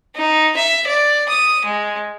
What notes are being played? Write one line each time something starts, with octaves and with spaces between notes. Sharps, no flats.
D#4
E5
D5
D#6
G#3